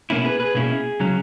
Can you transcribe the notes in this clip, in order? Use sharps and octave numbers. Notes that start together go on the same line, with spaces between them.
B2 A#3 C#4 E4
G#4 B4
G#4 B4
B2 A#3 C#4 E4 G#4
C#3 F#3 C#4